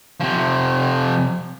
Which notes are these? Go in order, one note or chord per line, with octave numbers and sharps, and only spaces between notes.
C3 F3